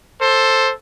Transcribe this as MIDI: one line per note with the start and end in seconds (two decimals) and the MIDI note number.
0.21 0.72 69
0.21 0.72 72